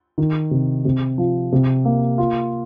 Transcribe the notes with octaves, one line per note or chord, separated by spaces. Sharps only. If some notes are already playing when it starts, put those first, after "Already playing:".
D#3
C3
C3
F3
C3
A#3
F4